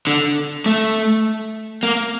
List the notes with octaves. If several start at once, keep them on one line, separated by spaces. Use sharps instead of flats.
D3
A3
A#3